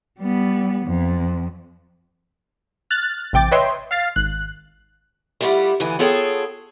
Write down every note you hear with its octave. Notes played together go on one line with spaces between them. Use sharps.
G3 B3
F2
F6 F#6 A6
A1 C3 G5 D6 A6
B4 C#5 D#5 E5 G5 C6
F5 F6 A6 C7
G#1 F#6
G3 A3 E4 F4 G4 F#5
D2 A#2 E3 B3 G#5
B3 F4 G#4 A4 C#5 G5